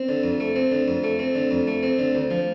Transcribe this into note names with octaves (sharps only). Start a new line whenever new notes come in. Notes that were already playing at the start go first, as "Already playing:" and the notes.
Already playing: C4
D3
F2
A3
C4
D3
F2
A3
C4
D3
F2
A3
C4
D3
D2
F3